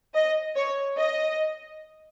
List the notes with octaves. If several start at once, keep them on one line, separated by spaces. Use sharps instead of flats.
D#5
C#5
D#5